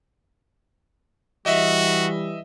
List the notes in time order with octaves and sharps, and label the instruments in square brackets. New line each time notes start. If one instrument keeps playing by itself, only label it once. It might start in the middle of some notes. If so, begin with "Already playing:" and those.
[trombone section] E3 G3 [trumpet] F#4 [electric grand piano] D#5 E5